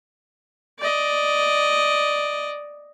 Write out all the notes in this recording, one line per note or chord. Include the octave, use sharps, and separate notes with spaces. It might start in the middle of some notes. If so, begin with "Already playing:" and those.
D5 D#5